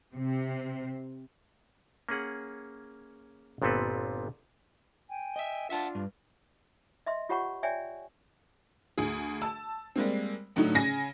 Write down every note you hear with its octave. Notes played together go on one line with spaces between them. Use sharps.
C3
A#3 C#4 G#4 F#5
G1 A#2 B3 C4 A4 B4
G5 G#5
D#5 E5
D4 F4 E5 F#5 A5
G2
D#5 E5 C6
F4 G4 C#5 F#5 A#5 C#6
C#5 D5 E5 G5 G#5
D2 G#4
A5 E6
G3 G#3 A#3 C4
A2 D3 F#3 D#4
C#3 G#5 A#6